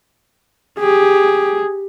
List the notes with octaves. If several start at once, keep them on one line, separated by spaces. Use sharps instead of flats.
G4 G#4